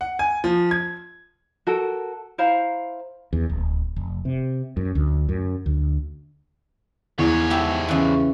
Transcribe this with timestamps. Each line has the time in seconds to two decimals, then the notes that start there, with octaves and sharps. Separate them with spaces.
0.01 F#5
0.19 G#5
0.44 F3
0.71 G#6
1.67 F#4 A4 A#4
2.38 E4 C5 F5 A#5
3.33 E2
3.50 D1
3.96 F1
4.25 C3
4.77 F#2
4.95 D2
5.29 F#2
5.66 D2
7.19 E2 G#2 C#5
7.50 E4 G4 A4
7.89 C#3 E3